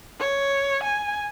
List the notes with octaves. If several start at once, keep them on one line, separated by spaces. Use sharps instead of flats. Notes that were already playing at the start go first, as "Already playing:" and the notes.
C#5
G#5